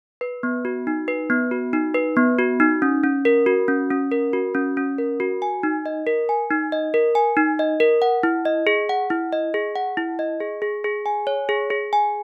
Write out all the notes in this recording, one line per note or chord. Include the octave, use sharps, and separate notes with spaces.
B4
B3
F#4
D#4
B4
B3
F#4
D#4
B4
B3
F#4
D#4
C#4
C#4
A#4
F#4
C#4
C#4
A#4
F#4
C#4
C#4
A#4
F#4
G#5
D#4
D#5
A#4
G#5
D#4
D#5
A#4
G#5
D#4
D#5
A#4
F#5
E4
D#5
G#4
F#5
E4
D#5
G#4
F#5
E4
D#5
G#4
G#4
G#4
G#5
C#5
G#4
G#4
G#5